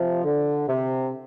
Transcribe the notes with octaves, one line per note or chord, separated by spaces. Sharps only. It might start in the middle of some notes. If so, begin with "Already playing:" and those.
Already playing: C3 F3
D3
C3